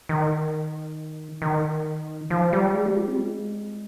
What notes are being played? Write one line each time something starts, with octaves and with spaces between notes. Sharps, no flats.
D#3
D#3
F3
G3
G#3
G4
F4
C4
G#3